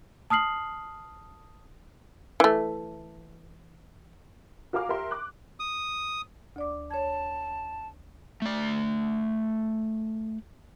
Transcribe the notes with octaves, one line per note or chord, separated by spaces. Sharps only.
A5 D#6 F6 C7 F#7
E3 A3
F#4 A#4 F5 G#5 D6 F6
G4 A#4 E5 C6
D6 F#6
D#6
D2 D5 D6
C#5 A5 G#6
A3 D5